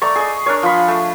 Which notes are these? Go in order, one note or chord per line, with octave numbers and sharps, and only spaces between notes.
A3 D5 A#5 C#6
G#4 D#5
D4 A#4 C#5
F3 B5
A3